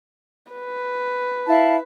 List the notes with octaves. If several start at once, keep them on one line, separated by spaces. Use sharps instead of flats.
B4
E4 F5 A5